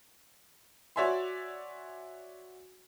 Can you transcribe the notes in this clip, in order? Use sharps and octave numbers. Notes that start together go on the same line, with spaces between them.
F#4 C#5 D5 E5 G#5 C6